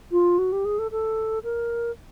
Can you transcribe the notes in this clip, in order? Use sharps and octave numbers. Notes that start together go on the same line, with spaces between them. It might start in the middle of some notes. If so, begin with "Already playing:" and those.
F4
F#4
G4
G#4
A4
A4
A#4